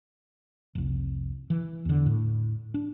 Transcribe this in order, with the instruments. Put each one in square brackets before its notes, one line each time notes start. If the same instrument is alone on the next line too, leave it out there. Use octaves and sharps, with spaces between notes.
[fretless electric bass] F1 C2
E3
E2 D3
A2
D4